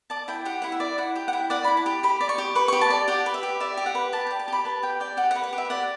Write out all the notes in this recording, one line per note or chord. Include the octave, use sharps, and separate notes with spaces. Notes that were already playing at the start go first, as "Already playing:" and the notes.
D5 A5
E4 G5
G4 F#5
E4 F#5
E5
D5
E4 F#5
G4 G5
F#5
E4 G5
D5 F#5
E4 B5
A5
G4
G4 B5
D5
C#6
G4
B4 C#6
C#6
G4
A5
D5
G4 F#5
B4
E5
G4
D5 E5
G4
F#5
B4
G4 A5
D5 G5
A5
G4 B5
B4 A5
G4 G5
D5 G5
G4 F#5
F#5
B4
F#5
G4
E5
D5 F#5